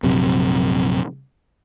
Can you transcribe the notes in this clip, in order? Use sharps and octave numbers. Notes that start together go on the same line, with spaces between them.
A#1 F#2 C3